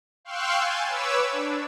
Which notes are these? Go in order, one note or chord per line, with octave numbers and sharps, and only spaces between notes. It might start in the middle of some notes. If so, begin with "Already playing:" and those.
F5 G5 C6 C#6 E6 F#6
G#5 G6 A6
B4 C#5 D6 E6
D4